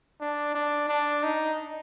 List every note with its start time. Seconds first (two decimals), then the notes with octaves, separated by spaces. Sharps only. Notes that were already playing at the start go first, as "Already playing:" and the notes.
0.21 D4
0.55 D4
0.89 D4
1.23 D#4